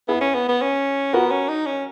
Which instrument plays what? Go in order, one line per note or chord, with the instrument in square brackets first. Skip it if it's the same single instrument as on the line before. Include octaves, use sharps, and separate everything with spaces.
[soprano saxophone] B3 [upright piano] E4 G#4
[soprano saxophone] C#4
B3
B3
C#4
[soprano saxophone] B3 [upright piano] F#4 A#4
[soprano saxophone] C#4
D#4
C#4